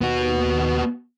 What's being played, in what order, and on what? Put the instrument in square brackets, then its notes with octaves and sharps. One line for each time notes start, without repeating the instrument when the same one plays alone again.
[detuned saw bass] D#2 [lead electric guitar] B3 F#4